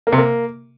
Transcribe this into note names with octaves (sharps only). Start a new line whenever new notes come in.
A#3
C3
A#3